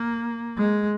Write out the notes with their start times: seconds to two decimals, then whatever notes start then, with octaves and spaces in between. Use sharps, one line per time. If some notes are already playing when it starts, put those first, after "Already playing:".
Already playing: A#3
0.57 G#3